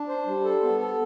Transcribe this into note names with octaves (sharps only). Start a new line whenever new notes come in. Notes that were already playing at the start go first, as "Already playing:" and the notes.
Already playing: D4
C5
G3
A4
B3
A4